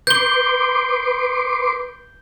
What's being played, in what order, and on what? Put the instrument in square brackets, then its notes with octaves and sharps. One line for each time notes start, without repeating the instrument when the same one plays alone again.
[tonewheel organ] B4 C6 D6 [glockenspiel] G6 G7